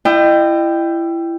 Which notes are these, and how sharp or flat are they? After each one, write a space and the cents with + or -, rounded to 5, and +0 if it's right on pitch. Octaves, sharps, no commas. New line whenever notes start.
E4 +25 D#5 -35 G5 +0